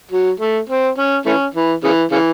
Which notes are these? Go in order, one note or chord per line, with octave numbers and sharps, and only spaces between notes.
F#3
A3
C4
C#4
E3 A3 C#4
E3
C#3 E3
C#3 E3